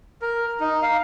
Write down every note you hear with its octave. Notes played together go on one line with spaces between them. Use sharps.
A#4
D#4
F5